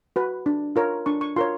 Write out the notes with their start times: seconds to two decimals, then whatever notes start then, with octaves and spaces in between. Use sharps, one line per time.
0.16 F#4 B4
0.46 D4
0.76 F4 A#4 C#5
1.06 D4 C#6
1.21 C#6
1.36 F4 A#4 C#5 C6